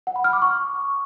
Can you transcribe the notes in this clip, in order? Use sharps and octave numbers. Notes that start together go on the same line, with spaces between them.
F#5
B5
F6
D6
C#6